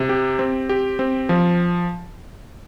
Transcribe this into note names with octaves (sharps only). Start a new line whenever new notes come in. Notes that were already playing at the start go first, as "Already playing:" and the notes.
Already playing: C3
G4
C4
G4
C4
F3